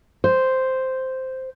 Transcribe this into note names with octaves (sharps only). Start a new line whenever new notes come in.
C5